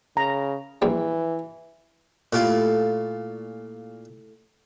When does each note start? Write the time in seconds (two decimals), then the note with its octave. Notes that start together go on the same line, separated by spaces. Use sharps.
0.17 C#3 A#5
0.82 A#1 E3 G3
2.33 A#2 A3 E4 F4 G4